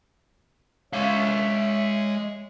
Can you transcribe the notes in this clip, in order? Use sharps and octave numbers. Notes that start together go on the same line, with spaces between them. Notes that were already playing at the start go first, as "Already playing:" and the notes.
G#3 C#5 E5 F5